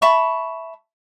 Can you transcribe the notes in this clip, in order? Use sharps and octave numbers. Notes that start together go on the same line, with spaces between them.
E5 A5 B5 C#6